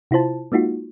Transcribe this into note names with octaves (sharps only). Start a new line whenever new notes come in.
C3 E4 F4 C5 A5
G#3 A#3 D#4 F4 F#4